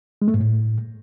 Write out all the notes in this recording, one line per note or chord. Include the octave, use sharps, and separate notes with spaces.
G#3
A3
G#2
A2